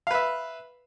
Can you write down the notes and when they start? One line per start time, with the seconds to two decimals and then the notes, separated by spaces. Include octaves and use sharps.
0.07 F5
0.11 B4
0.15 E5